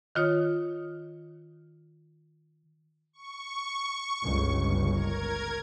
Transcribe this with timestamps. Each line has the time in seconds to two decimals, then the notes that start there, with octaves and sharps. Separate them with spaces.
0.15 D#3 F4 C#5 D#6
3.13 C#6
4.25 G1 C#2
4.92 A#4 G#6